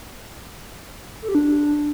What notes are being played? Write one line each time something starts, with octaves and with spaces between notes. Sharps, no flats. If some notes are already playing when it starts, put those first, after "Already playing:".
A4
G4
D4